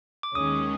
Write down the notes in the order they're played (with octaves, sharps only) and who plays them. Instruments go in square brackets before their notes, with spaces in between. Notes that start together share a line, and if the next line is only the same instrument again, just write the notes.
[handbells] D6
[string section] D#2 D#3 G#3 C#4 [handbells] D#6